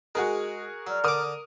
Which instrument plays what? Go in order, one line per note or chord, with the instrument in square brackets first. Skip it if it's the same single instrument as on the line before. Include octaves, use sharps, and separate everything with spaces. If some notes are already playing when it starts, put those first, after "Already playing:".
[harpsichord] G#3 [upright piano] F#4 G#4 A#4
[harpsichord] F#3 [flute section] D5 A#5 F6
[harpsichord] D3 D6 [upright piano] A#4 D#6